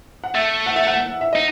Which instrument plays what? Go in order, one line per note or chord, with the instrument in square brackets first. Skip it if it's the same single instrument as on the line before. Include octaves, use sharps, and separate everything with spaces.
[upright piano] F#5
[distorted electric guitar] A3 [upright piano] E5
[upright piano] F#5
E5
F#5
E5
[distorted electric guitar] D#4 [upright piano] D#5